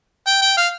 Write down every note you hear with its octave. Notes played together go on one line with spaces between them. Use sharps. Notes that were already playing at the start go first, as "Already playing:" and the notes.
G5
G5
F5